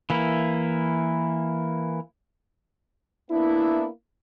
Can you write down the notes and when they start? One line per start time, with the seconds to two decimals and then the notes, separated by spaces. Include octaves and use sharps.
0.10 E3 A#3 E4
3.31 A#3 B3 D4 E4